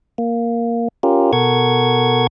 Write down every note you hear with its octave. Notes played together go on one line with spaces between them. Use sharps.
A#3
C#4 F4 G4 A#4
B2 A4 A#4 F#5 C#6 G#6